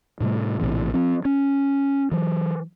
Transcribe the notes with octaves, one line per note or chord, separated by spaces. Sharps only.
A2 C3 G3 A3
A#1 A2 C3 E3
F3 C4
C#4
E3 F#3